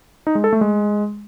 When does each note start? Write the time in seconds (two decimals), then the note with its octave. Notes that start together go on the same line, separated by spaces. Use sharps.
0.27 D#4
0.35 G#3
0.44 A4
0.53 A3
0.61 G#3